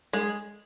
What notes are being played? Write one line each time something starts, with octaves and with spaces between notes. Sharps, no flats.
G#3